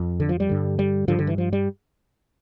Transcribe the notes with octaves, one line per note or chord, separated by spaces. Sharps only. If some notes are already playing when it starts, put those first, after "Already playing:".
Already playing: F2
D3
F3
G3
G2 D3
G3
G2 D3 F3
D3
E3
F3
G3